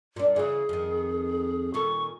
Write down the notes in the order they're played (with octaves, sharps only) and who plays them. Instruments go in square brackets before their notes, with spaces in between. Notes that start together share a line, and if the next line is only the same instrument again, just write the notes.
[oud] A#2 D4
[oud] C#3 E3 [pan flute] G#4
[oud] F2 D#3
[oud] A#2 D#3 A4 [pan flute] C#6